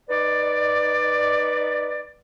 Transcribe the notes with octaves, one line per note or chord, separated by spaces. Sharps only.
D#4 B4 D5